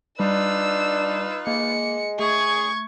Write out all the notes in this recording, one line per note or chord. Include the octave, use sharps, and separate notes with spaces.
G3 D4 D#4 F4 B4 E6
G#3 A#3 C#7
A3 G#4 C#6 G#6